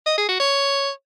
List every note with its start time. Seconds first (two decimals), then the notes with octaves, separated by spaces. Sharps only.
0.06 D#5
0.18 G#4
0.29 F#4
0.40 C#5